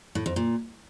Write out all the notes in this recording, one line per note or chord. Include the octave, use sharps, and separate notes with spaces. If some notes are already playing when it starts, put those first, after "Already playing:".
A2
F2
A#2